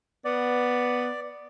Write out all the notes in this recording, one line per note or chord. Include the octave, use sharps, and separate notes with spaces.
B3 D5